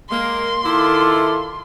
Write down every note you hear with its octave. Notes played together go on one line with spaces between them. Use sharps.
G#3 A#3 C6
D#3 E4 F4 A4 D6